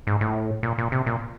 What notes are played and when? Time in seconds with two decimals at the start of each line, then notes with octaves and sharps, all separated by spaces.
0.07 G#2
0.21 A2
0.63 A#2
0.78 A#2
0.92 C3
1.06 A#2